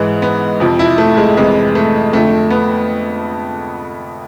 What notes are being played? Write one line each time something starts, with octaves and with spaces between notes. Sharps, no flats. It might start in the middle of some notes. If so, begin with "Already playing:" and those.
Already playing: G#2 E3 G#3
B3
F2 C3 F3
E4
A3
G#3
F2 C3 E3 G#3
A3
F2 D3 F3 A3
B3